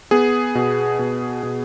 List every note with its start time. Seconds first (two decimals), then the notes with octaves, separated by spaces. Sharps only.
0.11 B3 G#4
0.55 B2
0.99 B2
1.43 B2